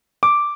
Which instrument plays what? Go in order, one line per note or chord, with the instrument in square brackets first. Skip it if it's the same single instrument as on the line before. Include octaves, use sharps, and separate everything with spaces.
[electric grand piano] D6